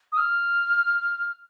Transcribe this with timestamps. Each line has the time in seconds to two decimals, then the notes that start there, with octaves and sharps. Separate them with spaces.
0.12 D#6
0.17 F6